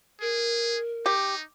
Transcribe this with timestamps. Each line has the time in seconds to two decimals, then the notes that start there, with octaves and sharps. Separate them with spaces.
0.21 G#4 A#4
1.06 D#4 G4